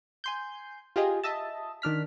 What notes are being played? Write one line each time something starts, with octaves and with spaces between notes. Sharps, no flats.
G#5 C6 G6
F4 G4 G#4 D#5
D#5 E5 A5
D#3 D4 F6 B6